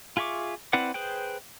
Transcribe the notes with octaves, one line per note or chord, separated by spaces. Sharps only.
F4 G#4 E5 C#6 D6
C4 E4 B4 D5 F#5
G#4 B4 C5 G5